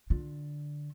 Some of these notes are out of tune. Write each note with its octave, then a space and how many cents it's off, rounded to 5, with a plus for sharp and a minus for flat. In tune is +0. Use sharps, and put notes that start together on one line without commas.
D3 +0 F4 +25